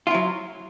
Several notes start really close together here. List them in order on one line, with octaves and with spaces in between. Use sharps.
F4 E4 F#3